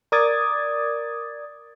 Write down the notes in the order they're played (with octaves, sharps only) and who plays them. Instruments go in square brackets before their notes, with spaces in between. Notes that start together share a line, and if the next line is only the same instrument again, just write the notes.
[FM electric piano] A#4 D5 D6 D#6 G#6 A6